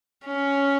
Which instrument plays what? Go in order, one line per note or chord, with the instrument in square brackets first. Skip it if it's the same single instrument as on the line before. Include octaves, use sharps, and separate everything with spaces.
[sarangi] C#4